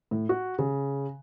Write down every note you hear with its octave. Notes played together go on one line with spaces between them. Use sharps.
A2
F#4
C#3